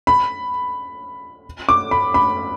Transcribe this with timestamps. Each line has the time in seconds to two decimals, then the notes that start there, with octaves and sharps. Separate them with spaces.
0.07 B5
1.69 D6
1.91 B5
2.14 B5